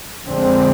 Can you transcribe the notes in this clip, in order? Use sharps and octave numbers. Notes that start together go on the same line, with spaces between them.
F2 D3 G#3 C4